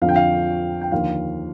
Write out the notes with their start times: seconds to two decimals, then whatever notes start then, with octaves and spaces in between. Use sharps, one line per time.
0.02 F2 D3 F3 F5
0.09 G5
0.16 F5
0.81 G5
0.92 D#2 D3 F3 F5